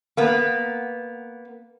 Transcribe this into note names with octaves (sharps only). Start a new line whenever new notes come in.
A#3 B3